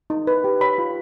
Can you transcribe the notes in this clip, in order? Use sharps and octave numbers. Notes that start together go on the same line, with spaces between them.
D#4
B4
G4
C#5 B5
F4